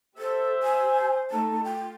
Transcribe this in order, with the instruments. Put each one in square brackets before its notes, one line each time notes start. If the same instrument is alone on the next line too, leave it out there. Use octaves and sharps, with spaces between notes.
[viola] G4 E5 [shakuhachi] A4 [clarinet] C5
[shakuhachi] G#5
[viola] A3 D#4 [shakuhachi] A5
[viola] F4 [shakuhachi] G5